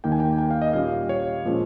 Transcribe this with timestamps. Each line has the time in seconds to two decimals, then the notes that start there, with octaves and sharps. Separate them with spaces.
0.04 D#2 D#3 A#3 D#4 G5
0.12 G#5
0.20 G5
0.38 G5
0.51 F5
0.62 D#5
0.73 A#2 G3 C#4 F5
1.09 C#5
1.45 A#2 F3 G#3 C#4